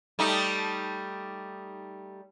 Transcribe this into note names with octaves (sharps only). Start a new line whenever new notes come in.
G3 A3 D#4